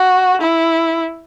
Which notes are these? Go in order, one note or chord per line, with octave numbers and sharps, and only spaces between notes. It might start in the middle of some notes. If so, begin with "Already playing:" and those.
Already playing: F#4
E4